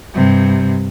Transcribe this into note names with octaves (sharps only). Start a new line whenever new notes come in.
G2 C3